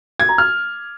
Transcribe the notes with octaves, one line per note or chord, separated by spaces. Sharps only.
G#6
A#5
F6